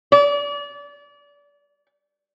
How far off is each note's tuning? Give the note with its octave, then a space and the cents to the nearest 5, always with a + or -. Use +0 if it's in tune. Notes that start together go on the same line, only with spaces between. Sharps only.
D5 -30